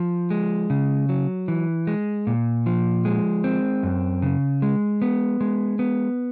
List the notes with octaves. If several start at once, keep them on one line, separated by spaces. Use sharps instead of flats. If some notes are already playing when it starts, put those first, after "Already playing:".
Already playing: F3
G#3
C#3
F#3
E3
G#3
A#2
F3
G#3
C4
F#2
C#3
G#3
B3
G#3
B3